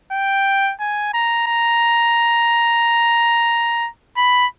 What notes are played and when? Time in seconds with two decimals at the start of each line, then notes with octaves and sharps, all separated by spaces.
0.12 G5
0.80 G#5
1.13 A#5
1.47 A#5
4.17 B5